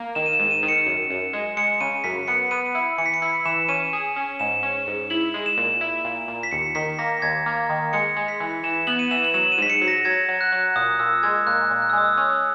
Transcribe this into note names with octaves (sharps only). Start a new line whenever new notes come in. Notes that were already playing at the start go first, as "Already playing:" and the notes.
Already playing: A#3
D#3 E7
D#7
E7
G#2
D#7
D#3
C#7
F#2
F#2
G#3
G#3 C#7
C#3 D#7
F#2 B6
B3 C#7
B3 D#7
E4 C#7
E3 C#7
B6
C#7
E4 B6
E3 E7
C#4 D#7
G#4
C#4
G#2 E7
C#4
G#2
E4 F#7
G#3
E7
A#2
E4
A#2
A#2
B6
D#2 C#7
D#3 B6
A#3 A#6
D#2 G#6
A#3
D#3
G#3 C#7
G#3
B6
E3
E3 E7
B3 F#7
D#7
E3 E7
F#7
F#3 E7
D#7
G#2 B6
C#7
F#3
A#6
F#3 G#6
F#3
F#6
F#3
A#2 D#6
A#2 E6
G#3 G#6
A#2 F#6
A#2
F#6
E6
G#3 D#6
E6
C#4 D#6